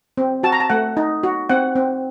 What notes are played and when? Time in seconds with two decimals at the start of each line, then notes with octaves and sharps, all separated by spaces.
0.17 C4
0.43 F#4 A5
0.52 A#5
0.60 A5
0.70 A3 F#5
0.97 D#4
1.23 F#4
1.49 C4 F#5
1.76 C4